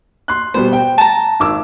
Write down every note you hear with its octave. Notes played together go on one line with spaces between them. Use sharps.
C6 F#6
B2 G3 B3 C5
G5
A5 A#5
G#1 D6 E6